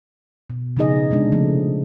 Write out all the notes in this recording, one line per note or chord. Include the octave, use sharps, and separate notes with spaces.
B2
C#3 F3 B3 D#4 G#4 D#5
C3 G#3 D4
C#3 F3 A3